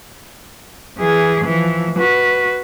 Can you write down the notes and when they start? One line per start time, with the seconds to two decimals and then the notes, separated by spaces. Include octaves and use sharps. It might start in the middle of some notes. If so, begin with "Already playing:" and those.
0.98 E3 G#4
1.45 E3 F3
1.99 F#4 B4